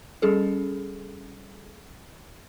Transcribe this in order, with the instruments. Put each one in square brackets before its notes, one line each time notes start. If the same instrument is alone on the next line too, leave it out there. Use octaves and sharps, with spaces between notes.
[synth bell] G3 C#4 G#4 A4